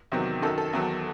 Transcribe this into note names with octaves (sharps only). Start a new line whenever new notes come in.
E2 C3 D#3 F#3
F#2 D#3 F#3 A4
A4
E2 D#3 F#3